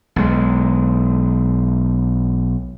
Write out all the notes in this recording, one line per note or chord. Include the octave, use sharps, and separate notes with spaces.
B1 G#3